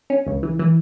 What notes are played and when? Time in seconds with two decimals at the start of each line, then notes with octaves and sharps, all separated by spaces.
0.10 C#4
0.27 C#2
0.43 E3
0.59 E3